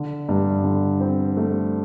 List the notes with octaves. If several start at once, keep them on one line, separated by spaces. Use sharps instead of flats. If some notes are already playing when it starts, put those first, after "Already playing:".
Already playing: D3
G2
D3
C4
A3